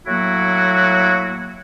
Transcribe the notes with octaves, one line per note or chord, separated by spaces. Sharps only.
A2 F#3 A#3 E4 F#4